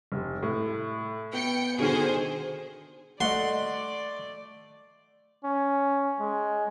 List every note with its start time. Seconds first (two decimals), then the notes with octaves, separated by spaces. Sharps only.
0.12 F1
0.43 A2
1.33 B3 G5 C#7
1.78 B2 D3 D#3 G#4 C5
3.20 A3 D5 D#5 F#5 C6
5.44 C#4
6.20 G#3